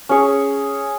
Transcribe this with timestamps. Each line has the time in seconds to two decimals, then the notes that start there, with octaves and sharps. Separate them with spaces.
0.09 C#4 G#4 C#5